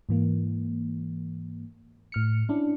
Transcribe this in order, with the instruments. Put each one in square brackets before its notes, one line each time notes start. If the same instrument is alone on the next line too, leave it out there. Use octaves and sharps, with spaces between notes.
[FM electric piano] G#2 E3 A#3
A2 F6 C#7
C#4 D4 E4